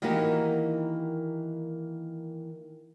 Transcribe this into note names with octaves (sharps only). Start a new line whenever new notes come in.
D#3 E3 A#3 D#4 F#4 G4